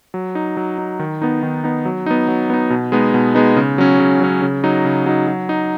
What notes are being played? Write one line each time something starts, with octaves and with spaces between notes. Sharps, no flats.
F#3
D#4
F#3
D#4
D#3
B3 D#4
D#3
B3 D#4
F#3
B3 D#4
F#3
B3 D#4
B2
G#3 B3 D#4
B2
G#3 B3 D#4
C#3
F#3 C#4
C#3
F#3 C#4
C#3
F#3 D#4
C#3
F#3 D#4
F#3
D#4